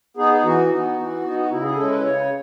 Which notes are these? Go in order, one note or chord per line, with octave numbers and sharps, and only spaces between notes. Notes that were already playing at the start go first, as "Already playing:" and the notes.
B3 D#4 G#4
G#4
E3 F#4
B3 D#4
E3
B3 D#4
F#4
C#3 E4
G#4
G#3 C#4 E4 A4
B4
C#3 C#5